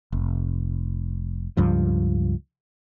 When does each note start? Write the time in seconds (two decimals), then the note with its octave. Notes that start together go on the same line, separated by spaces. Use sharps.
0.12 F1
1.57 C#2 G2 F3